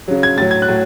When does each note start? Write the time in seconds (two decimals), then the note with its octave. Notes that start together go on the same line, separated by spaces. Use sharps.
0.08 C#3 F#3
0.23 G#6
0.38 A2 F#3 A6
0.51 G#6
0.62 F#6
0.68 A2 F#3